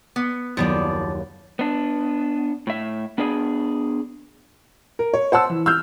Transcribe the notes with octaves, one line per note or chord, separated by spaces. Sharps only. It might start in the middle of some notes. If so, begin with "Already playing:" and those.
B3 B6 C#7
F#1 D#2 F3 B3 D5
B3 D4
A2 E5
B3 D4 G#4 D5
A#4
C#5
C5 F#5 A5 E6
E3
E6 F6 G6